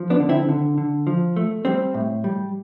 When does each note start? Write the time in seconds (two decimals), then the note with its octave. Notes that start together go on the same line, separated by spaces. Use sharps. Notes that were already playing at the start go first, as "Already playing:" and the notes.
Already playing: F3
0.10 B3 D4
0.20 D3
0.29 C4 E4
0.49 D3
0.78 D3
1.07 F3
1.37 A3
1.65 G3 C4
1.94 A2
2.24 G3